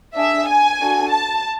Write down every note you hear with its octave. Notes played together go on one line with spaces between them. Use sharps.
D4 G#4 E5
G#5
D4 F#4 A4
A5